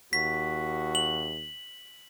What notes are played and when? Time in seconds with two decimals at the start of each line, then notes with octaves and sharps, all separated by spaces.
0.13 D#2 F#4 B6
0.95 F#7